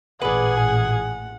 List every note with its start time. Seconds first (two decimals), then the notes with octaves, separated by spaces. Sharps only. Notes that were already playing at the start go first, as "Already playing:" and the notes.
0.22 A1 A#2 G#4 B4 D5 F#5
0.57 G#5